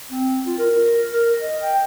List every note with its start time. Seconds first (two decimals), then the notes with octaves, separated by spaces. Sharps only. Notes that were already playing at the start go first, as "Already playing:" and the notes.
0.10 C4
0.46 F4
0.58 A#4
1.12 A#4
1.40 D#5
1.62 G5